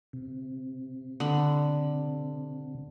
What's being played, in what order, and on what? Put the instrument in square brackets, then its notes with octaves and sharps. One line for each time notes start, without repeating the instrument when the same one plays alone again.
[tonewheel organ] C3
[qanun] D3 B5